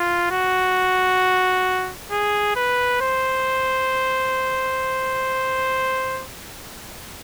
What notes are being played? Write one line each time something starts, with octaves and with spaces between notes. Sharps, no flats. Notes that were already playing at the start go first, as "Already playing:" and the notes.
Already playing: F4
F#4
G#4
B4
C5